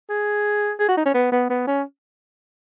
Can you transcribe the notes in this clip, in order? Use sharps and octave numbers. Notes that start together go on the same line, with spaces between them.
G#4
G#4
F#4
D#4
C#4
B3
B3
B3
C#4